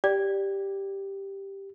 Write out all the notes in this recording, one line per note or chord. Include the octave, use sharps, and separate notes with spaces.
G4 D5